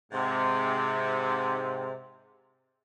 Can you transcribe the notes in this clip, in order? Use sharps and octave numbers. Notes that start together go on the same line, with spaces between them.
G#2 C3